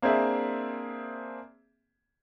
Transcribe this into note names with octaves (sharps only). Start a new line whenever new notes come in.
A#3 C4 D4 G#4 E5